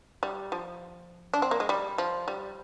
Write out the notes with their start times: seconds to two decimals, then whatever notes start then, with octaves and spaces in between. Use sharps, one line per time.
0.23 G3
0.52 F3
1.34 D4
1.42 C4
1.51 A#3
1.60 G#3
1.69 G3
1.98 F3
2.28 G3